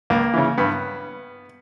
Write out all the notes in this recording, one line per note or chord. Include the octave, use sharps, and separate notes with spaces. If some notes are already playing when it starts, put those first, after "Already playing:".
C#2 A#3
C#3 E3
G2 B3